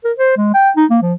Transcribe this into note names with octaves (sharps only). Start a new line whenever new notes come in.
A#4
C5
G#3
G5
D#4
A#3
F3